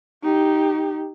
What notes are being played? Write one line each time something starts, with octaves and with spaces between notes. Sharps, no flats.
D#4 G4